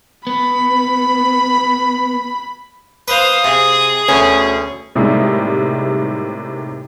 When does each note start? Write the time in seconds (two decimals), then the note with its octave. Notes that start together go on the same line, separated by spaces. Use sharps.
0.27 B3 B5
3.08 B4 C5 F5 D#6
3.44 C3 G#4
4.08 D2 B2 C#4
4.95 A2 C3 G3 G#3 A#3 D#4